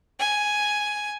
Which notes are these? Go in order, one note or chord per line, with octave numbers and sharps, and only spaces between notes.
G#5